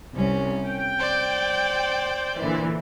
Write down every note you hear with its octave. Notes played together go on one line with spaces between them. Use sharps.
C2 C#4
G5
C5 D5
A#2 D3 E3